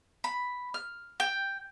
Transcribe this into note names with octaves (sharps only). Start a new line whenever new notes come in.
B5
F6
G5